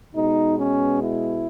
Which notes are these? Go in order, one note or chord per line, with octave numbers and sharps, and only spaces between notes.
B2 G#3 B3 D#4
C#4
E4